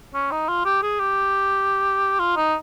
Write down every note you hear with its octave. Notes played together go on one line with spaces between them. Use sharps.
C#4
D#4
F4
G4
G#4
G4
F4
D#4